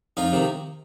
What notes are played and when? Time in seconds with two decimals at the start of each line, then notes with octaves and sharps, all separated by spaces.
0.17 F2 D#4 F4
0.32 C3 D#3